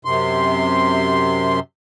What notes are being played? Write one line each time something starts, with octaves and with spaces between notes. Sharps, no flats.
F#2 C3 C6